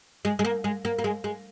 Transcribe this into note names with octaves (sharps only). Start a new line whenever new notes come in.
G#3
G#3
A#3
G#3
A#3
A#3
G#3
G#3